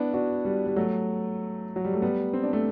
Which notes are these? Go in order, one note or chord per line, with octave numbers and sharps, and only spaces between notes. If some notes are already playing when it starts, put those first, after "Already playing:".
Already playing: B3 D4 E4
D4 F#4
G3
G3
F#3 A3
F#3
G3
A3
G3 B3
C4
D4
A3 C4